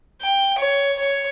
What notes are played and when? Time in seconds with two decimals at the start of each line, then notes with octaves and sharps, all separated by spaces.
0.22 G5
0.58 C#5
0.99 C#5